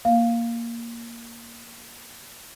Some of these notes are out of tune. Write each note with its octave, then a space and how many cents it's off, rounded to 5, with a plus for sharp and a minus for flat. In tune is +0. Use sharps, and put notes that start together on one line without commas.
A#3 +0 F5 +0